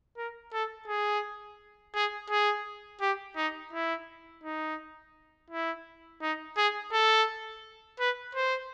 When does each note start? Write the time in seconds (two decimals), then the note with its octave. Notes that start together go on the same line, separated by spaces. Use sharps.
0.17 A#4
0.53 A4
0.88 G#4
1.95 G#4
2.30 G#4
3.01 G4
3.37 D#4
3.73 E4
4.44 D#4
5.51 E4
6.22 D#4
6.57 G#4
6.93 A4
8.00 B4
8.35 C5